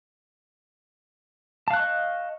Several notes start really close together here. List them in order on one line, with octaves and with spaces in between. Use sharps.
A5 F5 F#6 C#6 D#5